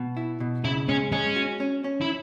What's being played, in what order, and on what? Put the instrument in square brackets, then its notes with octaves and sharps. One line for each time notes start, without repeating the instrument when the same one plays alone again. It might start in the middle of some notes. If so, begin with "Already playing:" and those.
Already playing: [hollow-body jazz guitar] B2
E4
B2
[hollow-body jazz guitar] C#3 [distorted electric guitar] E4
[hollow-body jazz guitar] G#3 [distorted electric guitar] C#4
[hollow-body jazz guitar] G#3 [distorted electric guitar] C#4
[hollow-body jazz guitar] F#4
C#4
C#4
[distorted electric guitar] E4